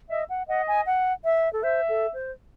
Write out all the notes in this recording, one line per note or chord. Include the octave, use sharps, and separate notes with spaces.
D#5 E5
F#5
D#5 F#5
G#5
F#5
E5
A4
C5 E5
A4
C5